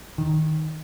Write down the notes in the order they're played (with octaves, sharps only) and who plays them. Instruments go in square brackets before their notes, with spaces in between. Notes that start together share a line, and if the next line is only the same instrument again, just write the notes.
[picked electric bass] D#3